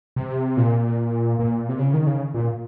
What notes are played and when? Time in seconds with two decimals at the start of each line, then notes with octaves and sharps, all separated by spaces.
0.16 C3
0.57 A#2
1.39 A#2
1.69 C3
1.79 C#3
1.94 D#3
2.07 C#3
2.34 A#2